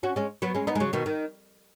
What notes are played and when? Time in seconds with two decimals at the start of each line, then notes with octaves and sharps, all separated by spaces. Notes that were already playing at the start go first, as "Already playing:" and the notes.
0.03 C#4 F#4
0.16 G#3 C#4
0.42 F#3 B3
0.55 G#3 C#4
0.67 B3 D#4
0.75 G#3
0.80 C#3 F#3
0.93 B2 D#3
1.06 D#3